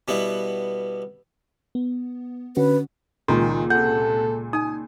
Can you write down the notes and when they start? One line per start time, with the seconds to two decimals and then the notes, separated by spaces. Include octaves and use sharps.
0.08 B2 G3 B3 E4
1.75 B3
2.57 D3 C#4 F#4 B4
3.28 C#2 A#2 D#3 C6
3.70 C3 A4 F#5 G6
4.53 D#4 G#5 D#6